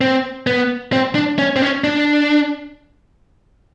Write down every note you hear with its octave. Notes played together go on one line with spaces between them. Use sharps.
C4
B3
C4
D4
C#4
C4
C#4
D4